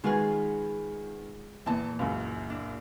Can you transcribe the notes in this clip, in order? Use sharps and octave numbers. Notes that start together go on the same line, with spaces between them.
D#3 G#3 F4 F#4 G#4 B4
E2 A#2 E3 A5
C#2 F#2
D4